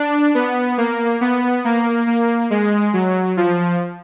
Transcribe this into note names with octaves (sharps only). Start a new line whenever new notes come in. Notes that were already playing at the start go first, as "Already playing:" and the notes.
Already playing: D4
B3
A#3
B3
A#3
A#3
G#3
F#3
F3